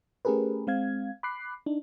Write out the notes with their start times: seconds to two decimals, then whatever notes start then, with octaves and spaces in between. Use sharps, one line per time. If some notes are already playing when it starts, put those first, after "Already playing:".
0.25 A3 C#4 G4 G#4 A#4 B4
0.67 G#3 C4 F5 G#6
1.23 B5 D6 F#6 C7
1.66 D4 D#4